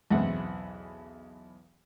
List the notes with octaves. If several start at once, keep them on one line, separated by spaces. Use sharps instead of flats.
B1 E2 C#3 E3 C4 F#5